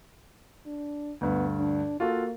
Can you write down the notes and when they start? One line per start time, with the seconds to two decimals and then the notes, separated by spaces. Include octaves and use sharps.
0.66 D4
1.21 D2 G2 B3
1.59 D4
2.00 A#3 F4 F#4 A4